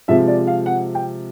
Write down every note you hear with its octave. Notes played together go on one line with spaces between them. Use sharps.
C3 F3 G#3 E5
D5
F5
F#5
G5